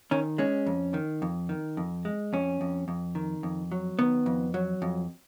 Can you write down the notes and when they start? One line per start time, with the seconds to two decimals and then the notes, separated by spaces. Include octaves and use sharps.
0.11 D#3 C#4
0.38 G#3 C#4
0.66 F2
0.94 D#3
1.22 F2
1.49 D#3
1.77 F2
2.05 G#3
2.33 F2 C#4
2.61 F2
2.88 F2
3.15 D#3
3.43 F2
3.72 F#3
3.99 D#3 B3
4.26 F2
4.54 F#3
4.82 F2